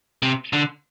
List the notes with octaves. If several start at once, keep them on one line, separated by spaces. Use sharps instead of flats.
C3
D3